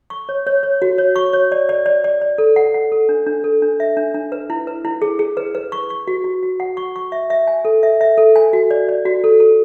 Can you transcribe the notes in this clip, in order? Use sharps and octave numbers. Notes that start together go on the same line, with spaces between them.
C#6
C#5
C#5
C#5
F#4
C#5
C#6
C#5
D5
D5
D5
D5
D5
A4
F#5
F#5
A4
D4
D4
A4
D4
E5
D4
D4
B4
E4
B4
E4
G#4
G#4
B4
B4
C#6
C#6
F#4
F#4
F#4
F#5
C#6
C#6
E5
E5
G#5
A4
E5
E5
A4
G#5
F#4
D5
D5
F#4
A4
A4